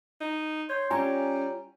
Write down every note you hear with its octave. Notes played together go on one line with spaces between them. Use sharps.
D#4
C#5 C6 G6
G3 C#4 F4 C#5 G#5 A#5